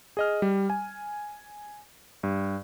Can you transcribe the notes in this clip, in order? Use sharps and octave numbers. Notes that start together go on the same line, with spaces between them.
G#4 D#5 F6
G3
G#5
G2